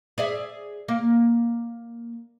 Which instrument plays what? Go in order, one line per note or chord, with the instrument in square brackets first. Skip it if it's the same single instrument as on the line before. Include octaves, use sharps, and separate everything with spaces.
[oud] G#4 D5 E5
A#3